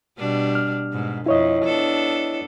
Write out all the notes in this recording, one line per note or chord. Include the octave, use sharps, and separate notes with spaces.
B2 G3 D4
F6
G#2 B2
F2 E4 C#5 D#5
B3 D4 A4